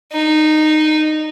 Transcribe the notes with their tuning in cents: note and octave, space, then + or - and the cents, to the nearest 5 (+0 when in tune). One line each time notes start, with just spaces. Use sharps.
D#4 -15